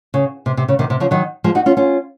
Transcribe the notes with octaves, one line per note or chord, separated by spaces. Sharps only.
C#3
C3
C3
C#3
C3 D#3
C3
C#3 F3
D#3 F#3
F3 G#3
D#4 F#4
C#4 F4
C#4 F4